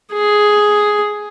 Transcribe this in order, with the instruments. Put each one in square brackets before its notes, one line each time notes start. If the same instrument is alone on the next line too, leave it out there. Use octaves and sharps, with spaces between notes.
[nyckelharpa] G#4